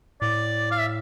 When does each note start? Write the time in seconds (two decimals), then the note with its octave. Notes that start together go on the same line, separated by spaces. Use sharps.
0.21 A2 D5
0.71 F5
0.79 E5